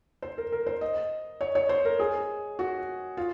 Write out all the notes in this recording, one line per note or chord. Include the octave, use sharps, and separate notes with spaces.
C5
A#4
A#4
C5
D#5
C#5
C#5
C5
A#4
G#4
F#4
F4